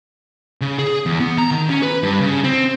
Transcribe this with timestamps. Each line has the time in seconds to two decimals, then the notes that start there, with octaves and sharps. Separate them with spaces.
0.61 C#3
0.79 G#4
1.06 E2
1.20 B3
1.38 A#5
1.51 D#3
1.69 C#4
1.83 B4
2.03 G2
2.21 C#3
2.44 C4